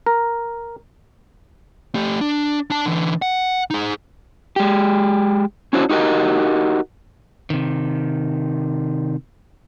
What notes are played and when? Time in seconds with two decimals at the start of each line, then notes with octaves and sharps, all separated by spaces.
0.06 A#4
1.95 A3 G4
2.21 D4
2.70 D4 A5
2.86 D3 E3
3.22 F#5
3.70 D#4 G#4
4.56 G#3 G4
5.73 C#4 D4 E4 F#4 C5 C#5
5.89 D#4 F#4 G4 A#4 D#5
7.50 C3 D#3